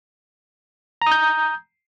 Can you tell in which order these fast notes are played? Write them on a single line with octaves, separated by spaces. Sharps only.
A#5 D#6 G6